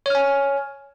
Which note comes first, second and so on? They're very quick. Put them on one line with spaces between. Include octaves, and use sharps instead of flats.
C#5 F6 G#5